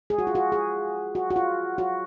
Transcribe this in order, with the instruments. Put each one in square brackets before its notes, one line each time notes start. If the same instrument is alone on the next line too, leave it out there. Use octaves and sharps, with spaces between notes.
[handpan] G#4
F#4
F4
F#4
G#4
F#4
F#4
F4
F#4